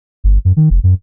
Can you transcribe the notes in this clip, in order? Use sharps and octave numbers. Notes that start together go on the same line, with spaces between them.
G1
F#2
D#3
F1
F#2